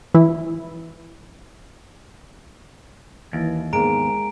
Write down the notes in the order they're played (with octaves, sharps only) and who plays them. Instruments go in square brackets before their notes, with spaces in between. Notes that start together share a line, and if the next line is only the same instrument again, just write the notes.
[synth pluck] E3 E4
[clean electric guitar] D#2 [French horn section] E3 [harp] D7
[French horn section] G#2 B3 [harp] G#3 A#3 [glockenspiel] A#5 D7